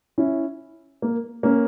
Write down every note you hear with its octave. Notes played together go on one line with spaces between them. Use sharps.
C#4 E4
A#3
A#3 C#4